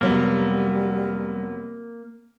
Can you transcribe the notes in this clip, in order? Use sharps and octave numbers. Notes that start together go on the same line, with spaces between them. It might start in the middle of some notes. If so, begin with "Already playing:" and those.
F1 F#3 G3 A#3 B3